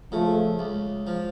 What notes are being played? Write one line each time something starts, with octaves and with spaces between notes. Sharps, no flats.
C#3 F3 A3
C#2
F3